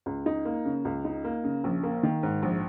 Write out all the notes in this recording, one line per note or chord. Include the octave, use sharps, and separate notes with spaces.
C#2
D#4
A#3
C#3
C#2
D#4
A#3
C#3
A#1
A#3
D#3
G#2
A#1